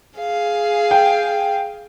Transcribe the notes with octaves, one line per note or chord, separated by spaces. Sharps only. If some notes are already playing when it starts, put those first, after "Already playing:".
G#4 F5
G5